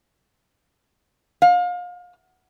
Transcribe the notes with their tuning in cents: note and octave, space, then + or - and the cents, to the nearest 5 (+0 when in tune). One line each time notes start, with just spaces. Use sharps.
F5 +30